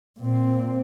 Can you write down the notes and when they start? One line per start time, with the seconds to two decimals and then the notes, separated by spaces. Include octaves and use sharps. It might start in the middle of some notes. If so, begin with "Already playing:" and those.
0.19 A#2 C4